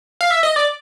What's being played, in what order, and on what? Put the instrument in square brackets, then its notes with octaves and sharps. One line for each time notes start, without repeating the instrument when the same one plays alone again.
[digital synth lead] F5
E5
D#5
D5